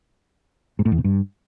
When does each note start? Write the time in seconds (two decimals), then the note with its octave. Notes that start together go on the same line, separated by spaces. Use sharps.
0.79 G#2
0.85 A2
0.92 E2
0.98 B2
1.04 G2